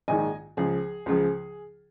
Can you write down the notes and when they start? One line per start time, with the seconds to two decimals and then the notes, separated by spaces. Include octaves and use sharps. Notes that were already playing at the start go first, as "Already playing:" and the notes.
0.08 A#1 G#2 D#3 D#5 G#5
0.57 C#2 C#3 F3 G#4
1.06 C#2 C#3 F3